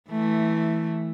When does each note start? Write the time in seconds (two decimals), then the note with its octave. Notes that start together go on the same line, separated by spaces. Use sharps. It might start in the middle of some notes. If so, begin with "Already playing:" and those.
0.10 E3 A3